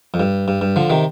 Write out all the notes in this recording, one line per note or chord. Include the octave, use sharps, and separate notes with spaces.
F2
G2
G2
G2
D3 F3
C3 D#3